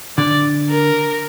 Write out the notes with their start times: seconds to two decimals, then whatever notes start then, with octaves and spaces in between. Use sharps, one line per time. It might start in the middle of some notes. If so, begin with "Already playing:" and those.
0.17 D3 D5
0.70 A#4